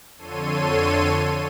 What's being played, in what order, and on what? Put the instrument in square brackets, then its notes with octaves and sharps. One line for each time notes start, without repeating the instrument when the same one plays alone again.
[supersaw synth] F2 D3 A4 C#5 C6 D#7